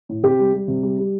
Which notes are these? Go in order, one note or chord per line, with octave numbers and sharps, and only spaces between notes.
A2
C3 G4
G3
G3
C3
G3
G3